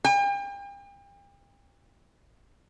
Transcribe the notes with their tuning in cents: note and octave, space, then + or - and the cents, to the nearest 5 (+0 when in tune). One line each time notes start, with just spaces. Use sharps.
G5 +40